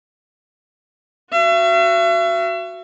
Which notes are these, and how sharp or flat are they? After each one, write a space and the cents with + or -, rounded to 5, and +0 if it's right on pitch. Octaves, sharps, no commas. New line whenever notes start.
F#4 +0 E5 +40